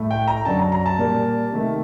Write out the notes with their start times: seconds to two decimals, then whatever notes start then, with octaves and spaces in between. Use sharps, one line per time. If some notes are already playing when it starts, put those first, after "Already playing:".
Already playing: A2 A3
0.11 G5
0.28 A#5
0.45 F#2 D3 F#3 A5
0.59 A#5
0.72 A#5
0.86 A5
0.99 A#2 G3 A#3
1.52 C3 D#3 A3